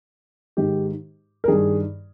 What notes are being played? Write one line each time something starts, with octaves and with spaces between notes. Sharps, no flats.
G#2 D#3 G4
A#4
G2 D#3 G#4